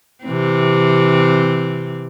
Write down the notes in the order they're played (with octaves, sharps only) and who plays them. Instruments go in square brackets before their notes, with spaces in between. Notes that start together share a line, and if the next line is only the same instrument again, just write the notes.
[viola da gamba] C3 E3 C4